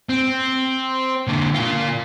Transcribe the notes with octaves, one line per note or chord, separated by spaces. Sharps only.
C4
D3 A#3
A#3 F4